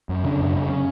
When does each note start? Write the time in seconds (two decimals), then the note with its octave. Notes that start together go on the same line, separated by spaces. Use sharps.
0.09 F#2
0.24 C#3 D4
0.39 F#2
0.54 C#3
0.69 C#4